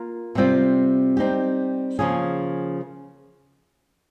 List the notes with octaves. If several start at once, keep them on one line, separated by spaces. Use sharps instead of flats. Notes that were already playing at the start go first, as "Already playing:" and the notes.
Already playing: A#3 F4 A#4
C3 G3 C4 F4
G3 C4 D#4 G4
C#3 F3 A#3 C#4 G#4